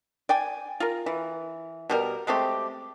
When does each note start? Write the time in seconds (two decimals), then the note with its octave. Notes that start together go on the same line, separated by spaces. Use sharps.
0.29 D5 G5 G#5
0.80 F4 A#4
1.06 E3
1.90 B2 G3 A#4
2.27 G#3 A3 C4 G4